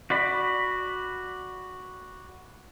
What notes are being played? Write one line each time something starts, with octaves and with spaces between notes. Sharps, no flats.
F#4 D5 B5